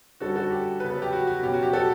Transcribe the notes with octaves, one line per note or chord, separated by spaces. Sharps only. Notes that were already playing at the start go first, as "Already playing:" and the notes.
D3 G3 C#4 F#4 A4
F#4 A4
G4
C#3 F#3 B3 B4
A4
G4
F#4
F#4
B2 F#3 C#4 G4
F#4
G4
F#4 A4